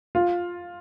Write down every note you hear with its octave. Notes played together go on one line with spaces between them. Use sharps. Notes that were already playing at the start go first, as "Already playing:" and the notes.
F4